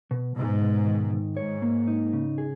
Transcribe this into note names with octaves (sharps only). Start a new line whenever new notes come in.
B2
G#2 B2
B2
D#3
D#3
G#2 C#5
A#3
D#4
C#3
G#4